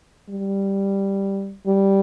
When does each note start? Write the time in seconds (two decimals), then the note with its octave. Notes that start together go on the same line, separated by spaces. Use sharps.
0.30 G3
1.67 G3